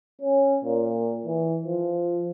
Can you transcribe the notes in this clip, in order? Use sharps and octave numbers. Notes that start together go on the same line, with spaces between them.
C#4
A#2
E3
F3